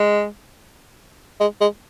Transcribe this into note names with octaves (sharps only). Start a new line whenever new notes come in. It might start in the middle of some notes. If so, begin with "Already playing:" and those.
Already playing: G#3
G#3
G#3